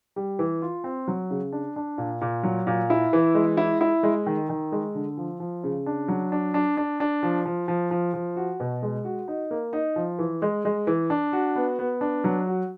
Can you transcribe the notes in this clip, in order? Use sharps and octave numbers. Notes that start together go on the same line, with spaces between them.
G3
E3
F4
C4
F#3
C#3
D4
D4
A#2
A#2
F#3
A#2
E4
E3
G#3
E4
E4
G#3
D#3
D#3
G#3
D3
F3
F3
C#3
D4
F#3
D4
D4
D4
D4
F3
F3
F3
F3
F3
F#4
B2
G#3
F#4
D#4
A#3
D#4
F3
E3
G#3
G#3
E3
D4
F#4
B3
B3
D4
F#3
F#4